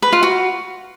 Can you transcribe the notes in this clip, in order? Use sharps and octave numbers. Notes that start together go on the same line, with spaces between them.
B4
F4
F#4